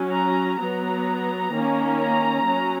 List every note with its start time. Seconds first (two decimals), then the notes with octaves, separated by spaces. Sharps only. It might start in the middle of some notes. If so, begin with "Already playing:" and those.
Already playing: F#3 C#4
0.12 A#5
0.59 F#3 B3 A#5
1.52 D#3 A#3 C#4
1.98 A#5
2.44 F#3 C#4